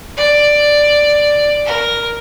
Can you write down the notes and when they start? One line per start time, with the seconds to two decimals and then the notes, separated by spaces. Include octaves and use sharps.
0.17 D5
1.66 A#4